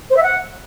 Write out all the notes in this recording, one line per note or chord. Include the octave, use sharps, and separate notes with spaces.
C5
E5
F#5